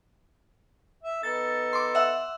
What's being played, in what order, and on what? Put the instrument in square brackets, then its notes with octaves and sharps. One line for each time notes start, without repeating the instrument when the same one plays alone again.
[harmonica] E5
[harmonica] B3 D#4 A4 [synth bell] A6
[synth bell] C6 D6
E5 F#5 E6